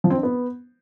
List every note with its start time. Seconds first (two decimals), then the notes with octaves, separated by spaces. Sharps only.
0.04 F3
0.10 C4
0.17 D4
0.23 B3